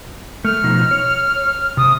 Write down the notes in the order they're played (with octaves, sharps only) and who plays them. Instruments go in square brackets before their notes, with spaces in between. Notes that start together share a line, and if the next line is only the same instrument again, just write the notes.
[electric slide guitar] A3 [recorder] F6
[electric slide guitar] B2 F3 D#4
C#5
[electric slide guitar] C3 [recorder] D#6